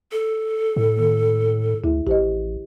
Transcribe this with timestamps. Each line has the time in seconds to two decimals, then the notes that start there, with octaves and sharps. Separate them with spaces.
0.12 A4
0.76 A2
0.97 D#3 A#3
1.84 D2 E4 G#4 E5
2.07 A1 G4 C5 D#5